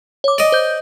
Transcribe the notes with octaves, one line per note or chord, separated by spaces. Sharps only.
C#5 D6
D5 D#5
C5 G6